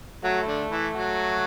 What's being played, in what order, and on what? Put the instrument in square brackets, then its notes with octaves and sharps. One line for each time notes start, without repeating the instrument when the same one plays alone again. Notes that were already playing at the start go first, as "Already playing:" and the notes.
[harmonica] F#3 F#4 [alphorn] A3
[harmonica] E4
D3 D4
E3 E4
F#3 F#4